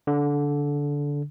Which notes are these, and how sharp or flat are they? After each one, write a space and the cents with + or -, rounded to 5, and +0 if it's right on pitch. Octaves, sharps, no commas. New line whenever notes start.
D3 -20